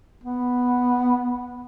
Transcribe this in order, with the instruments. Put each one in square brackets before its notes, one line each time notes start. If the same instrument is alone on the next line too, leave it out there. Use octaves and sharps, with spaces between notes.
[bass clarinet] B3